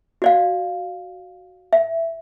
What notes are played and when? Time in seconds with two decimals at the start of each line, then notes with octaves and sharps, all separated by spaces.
0.22 F#4 D5 F5
1.73 E5